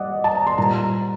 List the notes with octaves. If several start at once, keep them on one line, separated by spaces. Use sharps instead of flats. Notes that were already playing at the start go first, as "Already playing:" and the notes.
Already playing: G3 D5 D#5 F#5
A5
A#5
C6
A#2 G3 A#5